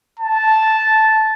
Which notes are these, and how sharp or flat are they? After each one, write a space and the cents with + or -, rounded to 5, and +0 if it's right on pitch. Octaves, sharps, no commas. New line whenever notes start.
A5 -5